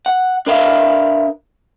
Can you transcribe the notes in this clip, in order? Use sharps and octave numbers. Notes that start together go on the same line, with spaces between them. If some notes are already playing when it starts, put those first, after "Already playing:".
F#5
D4 A#4 B4 E5 F5